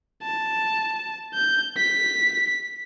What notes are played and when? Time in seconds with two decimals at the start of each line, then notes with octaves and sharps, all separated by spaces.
0.23 A5
1.35 G6
1.77 B6